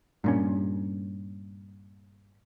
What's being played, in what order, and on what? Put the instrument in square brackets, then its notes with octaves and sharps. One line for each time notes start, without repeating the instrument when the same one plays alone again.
[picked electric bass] G2 A#2 C#4